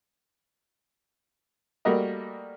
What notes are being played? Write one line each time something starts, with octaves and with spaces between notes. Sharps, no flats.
G3 A3 A#3 F#4 A#4 D#5